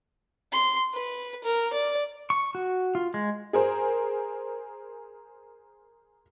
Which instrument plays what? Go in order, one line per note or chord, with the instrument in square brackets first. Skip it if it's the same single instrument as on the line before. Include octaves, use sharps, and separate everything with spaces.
[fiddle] C6
B4
A#4
D5
[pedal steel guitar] C#6
F#4
F4
G#3
[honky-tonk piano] G#4 A#4 C5